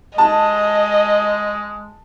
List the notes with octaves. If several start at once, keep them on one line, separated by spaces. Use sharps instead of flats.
G#3 D#5 A5